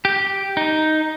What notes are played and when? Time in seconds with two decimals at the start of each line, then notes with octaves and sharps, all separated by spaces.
0.05 G4
0.57 D#4